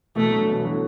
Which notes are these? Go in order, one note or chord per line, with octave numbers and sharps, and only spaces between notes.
B2 E3 A3
D3 F#3
B2 E3
E3
D3 F#3